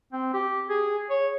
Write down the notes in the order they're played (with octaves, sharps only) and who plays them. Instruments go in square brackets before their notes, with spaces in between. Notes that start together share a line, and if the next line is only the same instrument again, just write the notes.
[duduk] C4
G4
G#4
C#5